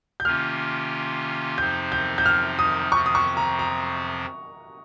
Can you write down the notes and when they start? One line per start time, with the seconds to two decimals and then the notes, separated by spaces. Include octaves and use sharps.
0.20 G6
0.25 C3 D#3 A#3 C#4 F4 F6
1.58 F2 C3 F3 C4 D#4 G6
1.92 G6
2.18 G6
2.26 F6
2.59 D#6
2.92 F2 C3 F3 C4 C#6
3.06 D#6
3.15 C#6
3.37 A#5
3.59 A#5